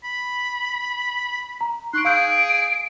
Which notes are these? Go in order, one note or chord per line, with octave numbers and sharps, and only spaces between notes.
B5
A#5
D#4 C6 C#6 F#6 D7
G#4 F5 E6 G6 D7